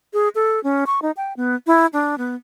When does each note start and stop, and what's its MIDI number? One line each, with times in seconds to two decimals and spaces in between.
0.13 0.29 68
0.35 0.62 69
0.64 0.84 61
0.87 1.00 85
1.02 1.11 63
1.17 1.33 79
1.37 1.55 59
1.67 1.86 64
1.93 2.15 62
2.18 2.35 59